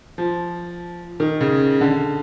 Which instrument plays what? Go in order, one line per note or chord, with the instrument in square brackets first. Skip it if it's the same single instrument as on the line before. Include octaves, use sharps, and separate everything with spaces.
[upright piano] F3
D#3
C#3
D3